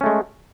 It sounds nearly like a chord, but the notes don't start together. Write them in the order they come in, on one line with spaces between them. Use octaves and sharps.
C#4 A3 G#3